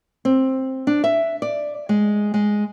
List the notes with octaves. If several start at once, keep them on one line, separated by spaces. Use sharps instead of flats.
C4
D4
E5
D5
G#3
G#3